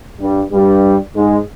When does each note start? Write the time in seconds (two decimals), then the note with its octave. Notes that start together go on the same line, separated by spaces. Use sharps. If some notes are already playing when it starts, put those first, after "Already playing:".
0.20 G2 G3
0.52 G2 G3
1.15 G#2 G#3